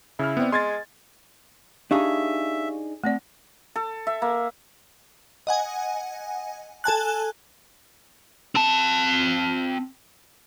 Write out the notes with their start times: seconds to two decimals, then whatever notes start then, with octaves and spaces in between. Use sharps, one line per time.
0.19 C#3 E4 F6
0.37 B3 C4 D5
0.52 G#3 C6 G#6 A6
1.91 D4 D#4 G4 G#4 E5 F5 C#6
3.04 A3 C4 D5
3.76 A4
4.07 E5
4.22 A#3
5.47 D#5 F#5 G#5
6.84 A4 G#5 A5 F#6
8.55 C4 A5